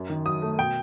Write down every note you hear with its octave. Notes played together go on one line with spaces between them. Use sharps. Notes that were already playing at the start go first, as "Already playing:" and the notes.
Already playing: F#2
D#3
F#3 D#6
A3
B2 G5